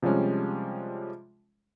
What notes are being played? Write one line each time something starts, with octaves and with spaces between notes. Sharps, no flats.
C3 F3 G3 G#3 C#4